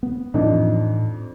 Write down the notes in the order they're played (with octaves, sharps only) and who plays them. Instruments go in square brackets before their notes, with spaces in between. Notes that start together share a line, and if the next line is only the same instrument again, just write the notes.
[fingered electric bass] B3
[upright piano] F2 D4 D#4 [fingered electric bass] A2 E3